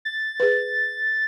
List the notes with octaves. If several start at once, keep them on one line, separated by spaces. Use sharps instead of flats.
A6
G#4 B4